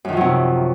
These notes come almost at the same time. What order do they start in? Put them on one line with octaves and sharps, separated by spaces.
F#2 D#3 F3 F#3 C3